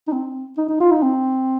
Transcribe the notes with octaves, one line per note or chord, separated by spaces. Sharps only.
D#4
C4
D#4
D#4
F4
D#4
C4